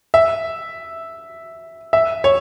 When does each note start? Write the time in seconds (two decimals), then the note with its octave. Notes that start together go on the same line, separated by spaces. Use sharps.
0.14 E5
1.93 E5
2.24 C#5